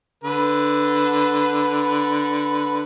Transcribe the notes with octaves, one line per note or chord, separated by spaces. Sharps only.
D3 B4